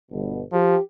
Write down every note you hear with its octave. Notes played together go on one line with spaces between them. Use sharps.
G1 B2
F3 G4